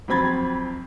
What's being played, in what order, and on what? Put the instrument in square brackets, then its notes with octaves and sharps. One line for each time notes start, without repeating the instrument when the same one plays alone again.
[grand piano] F2 F#3 C4 B5 G#6 A6